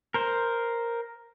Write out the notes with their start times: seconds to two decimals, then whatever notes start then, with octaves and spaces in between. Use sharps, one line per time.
0.14 A#4 C5